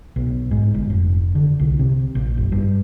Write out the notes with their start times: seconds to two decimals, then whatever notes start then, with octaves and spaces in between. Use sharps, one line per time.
0.16 B1
0.51 G#2
0.74 G1
0.90 F1
1.35 D3
1.60 C2
1.79 C3
2.15 A#1
2.37 F#1
2.52 G2